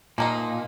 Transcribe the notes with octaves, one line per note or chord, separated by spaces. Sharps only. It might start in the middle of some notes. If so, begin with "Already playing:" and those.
A#2 F3 A#3 D#4